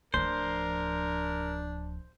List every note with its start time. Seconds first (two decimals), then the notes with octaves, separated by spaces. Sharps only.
0.14 D1 F3 D4 A#4 C5